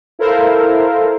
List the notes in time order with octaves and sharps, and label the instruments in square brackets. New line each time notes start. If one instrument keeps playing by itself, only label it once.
[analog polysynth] E4 A4 A#4 C5 F5